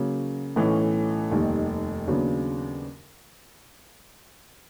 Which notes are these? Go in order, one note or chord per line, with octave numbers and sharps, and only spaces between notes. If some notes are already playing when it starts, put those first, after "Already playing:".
Already playing: C#3 F#3 A#3
B1 A2 E3 A3 C#4
F1 D#2 D#3 G3
D#2 C#3 F#3 B3 D4